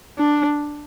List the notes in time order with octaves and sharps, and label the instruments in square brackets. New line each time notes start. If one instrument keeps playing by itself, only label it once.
[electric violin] D4